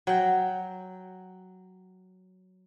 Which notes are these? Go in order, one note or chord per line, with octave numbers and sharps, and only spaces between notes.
F#3 G5